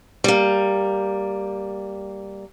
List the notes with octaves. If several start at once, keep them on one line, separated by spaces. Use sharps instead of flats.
G3 A#3